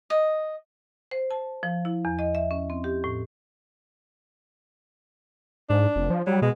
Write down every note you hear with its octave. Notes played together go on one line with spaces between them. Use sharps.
D#5
C5
A5
F3
E4
E2
D#5
E5
C#4
C4
G4
A2
G#2 D4
F1
F3
F#3 G3
B2 G#3